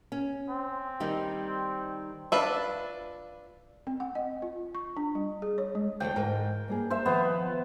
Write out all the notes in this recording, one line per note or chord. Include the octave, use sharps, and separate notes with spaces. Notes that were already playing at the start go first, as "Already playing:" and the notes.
C#4
C4
D#3 G3 D#4
D4 F4 B4 E5
C4
F#5
D#5
F4
C#6
D4
G3
G#4
C#5
G#3
D2 E3 A3 G5
G#2 A#4
G2 A#3 G#4
C5 E5
D#3 F3 B3 F5